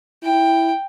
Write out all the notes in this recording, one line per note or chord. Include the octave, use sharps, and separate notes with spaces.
E4 G5